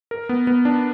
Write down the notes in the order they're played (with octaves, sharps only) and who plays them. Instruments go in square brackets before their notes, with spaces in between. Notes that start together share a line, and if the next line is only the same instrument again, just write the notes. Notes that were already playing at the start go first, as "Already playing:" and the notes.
[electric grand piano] A#4
B3
B3
D4